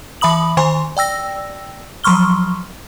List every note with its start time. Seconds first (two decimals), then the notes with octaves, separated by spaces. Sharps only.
0.21 E3 E5 B5 D#6 F#7
0.57 D#3 C5 G#5 C6
0.97 D5 G5 E6 A#6
2.04 F3 F#3 C6 C#6 F6 G7